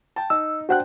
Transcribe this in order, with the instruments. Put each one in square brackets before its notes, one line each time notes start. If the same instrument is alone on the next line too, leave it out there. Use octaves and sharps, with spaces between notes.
[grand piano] G5 A5
[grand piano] D#4 [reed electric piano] E6
[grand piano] D4 C5 G5 [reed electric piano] F#4 F#5 F#6